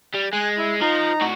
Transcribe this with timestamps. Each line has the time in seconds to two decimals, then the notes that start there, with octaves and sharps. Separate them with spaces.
0.14 G3
0.33 G#3 G#5 F#6
0.58 E4
0.81 F3 D#4 A#5
1.21 A2 F#4